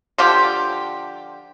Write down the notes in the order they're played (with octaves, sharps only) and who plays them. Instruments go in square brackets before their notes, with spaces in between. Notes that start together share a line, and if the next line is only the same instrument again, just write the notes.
[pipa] D3 F3 F4 G4